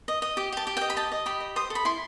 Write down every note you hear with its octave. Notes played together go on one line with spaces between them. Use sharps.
D#5
D#5
G4
G4 A5
G4
D#5 G5
B5
D#5 A5
D#5
G4 B5
D#5
C5 D#6
A4
B5
E4 C6